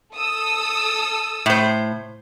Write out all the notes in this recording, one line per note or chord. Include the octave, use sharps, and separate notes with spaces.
A4 D#6 E6
A2 C5